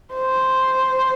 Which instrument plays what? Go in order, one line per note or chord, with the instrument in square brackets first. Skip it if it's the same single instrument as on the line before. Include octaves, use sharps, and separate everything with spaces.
[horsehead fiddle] C5